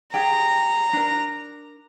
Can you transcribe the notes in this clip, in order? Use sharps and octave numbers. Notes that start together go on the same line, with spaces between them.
G4 G#4 G5 A#5
D4 A#4